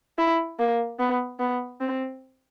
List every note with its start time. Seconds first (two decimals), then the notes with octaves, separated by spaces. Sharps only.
0.18 E4
0.59 A#3
0.99 B3
1.39 B3
1.81 C4